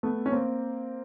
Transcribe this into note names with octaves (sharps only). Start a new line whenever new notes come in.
A3 B3
C#4
A#3 C4